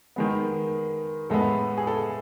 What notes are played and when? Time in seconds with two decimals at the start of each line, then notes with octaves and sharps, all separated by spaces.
0.16 D#3 G#3 B3
1.30 A2 G#3 B3 A4
1.78 G#4
1.87 A4